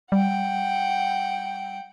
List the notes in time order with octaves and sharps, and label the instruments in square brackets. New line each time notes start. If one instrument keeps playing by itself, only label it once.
[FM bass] G3 [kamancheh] F#5 G5